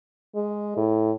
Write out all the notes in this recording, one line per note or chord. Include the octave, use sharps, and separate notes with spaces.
G#3
A2